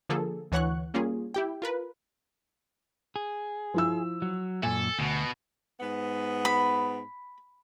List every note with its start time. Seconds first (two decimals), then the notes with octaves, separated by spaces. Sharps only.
0.09 D3 F3 A#3 G#4 A4
0.52 D2 E3 C#5 F#5 C#6 F#6
0.94 G3 A#3 C#4 F4 G#4
1.34 E4 G4 G5
1.62 F4 A#4 B4
3.16 G#4
3.74 F3 E4 E6
4.22 F#3
4.63 F#2 A#2 A4 G#5
4.99 D2 B2
5.79 G#2 B3
6.45 B5